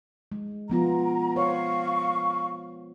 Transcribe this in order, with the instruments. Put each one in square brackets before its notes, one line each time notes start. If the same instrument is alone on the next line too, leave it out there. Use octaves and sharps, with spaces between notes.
[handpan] G#3
[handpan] F3 B3 F4 [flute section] A#5
[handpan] C5 C#5 [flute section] F5 C#6